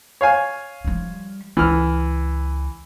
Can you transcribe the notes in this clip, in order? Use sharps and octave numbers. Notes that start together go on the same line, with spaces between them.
C#5 F5 G#5
F3 G3
C#2 E3 F6